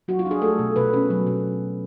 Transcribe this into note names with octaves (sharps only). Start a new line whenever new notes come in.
F#3 F#4
F4
D4
G#4
A3 A4
B2
B2 B4
C#4
F#3
B2